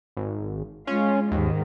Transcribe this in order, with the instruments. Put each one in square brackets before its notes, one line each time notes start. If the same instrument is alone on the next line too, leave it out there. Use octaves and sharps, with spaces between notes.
[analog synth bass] G#1
[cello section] G#3 F4 [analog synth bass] C#4
[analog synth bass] D#2 [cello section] G#2 D#3